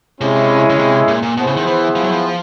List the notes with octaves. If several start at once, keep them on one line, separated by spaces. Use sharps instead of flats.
C3 G#3 C#4 E4
C#3
C3
A#2
A#2
B2 B3 E4 G#4 C5
C#3
D#3
E3
F3
F#3
F3